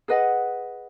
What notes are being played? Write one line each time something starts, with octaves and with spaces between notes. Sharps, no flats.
G#4 B4 D#5 F#5